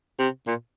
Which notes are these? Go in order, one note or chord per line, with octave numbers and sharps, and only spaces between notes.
C3
A#2